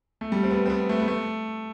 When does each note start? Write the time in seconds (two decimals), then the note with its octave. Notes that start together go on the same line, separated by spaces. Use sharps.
0.21 A3
0.32 G3
0.43 C4
0.51 B3
0.66 C4
0.70 B3
0.89 A3
1.00 B3
1.08 A3